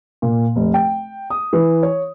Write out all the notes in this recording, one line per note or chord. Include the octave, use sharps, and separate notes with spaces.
A#2
F1
G5
D#6
E3
C#5